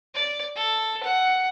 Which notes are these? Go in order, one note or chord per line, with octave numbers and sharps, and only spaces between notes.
D5
A4
F#5